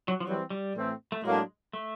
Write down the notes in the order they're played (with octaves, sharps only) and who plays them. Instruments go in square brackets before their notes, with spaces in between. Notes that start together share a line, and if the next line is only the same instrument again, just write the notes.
[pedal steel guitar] F#3
F3
[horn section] E3 G3 C4 [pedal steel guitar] F#3
[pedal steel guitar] G3
[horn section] A2 E3 A3 C4
[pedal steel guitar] A3
[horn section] A2 F#3 A#3 D4 [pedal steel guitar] G#3
[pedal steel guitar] A3